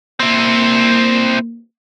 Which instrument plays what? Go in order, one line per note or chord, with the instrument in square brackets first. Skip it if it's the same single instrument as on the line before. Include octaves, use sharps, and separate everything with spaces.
[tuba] A#3 [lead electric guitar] C4 E4